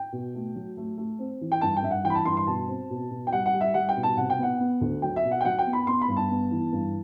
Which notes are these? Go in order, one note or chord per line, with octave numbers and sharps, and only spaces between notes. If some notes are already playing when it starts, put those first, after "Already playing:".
Already playing: G5
B2
A3
F#3
A3
A3
C4
E3
G5
G2 A5
G5
G2 E5
F#5
E3 G5
B5
A5
G2 C6
C6
B2 A5
C4
B2
B2
G5
G3 F#5
F#5
G3
E5
G3 F#5
G5
B2
A5
C3 F#5
G5
B3 F#5
B3
D2
F#3 G5
E5
B2
F#5
G5
F#3 F#5
G5
B3
B5
B3 C6
B5
G2
A5
B3
E3
G2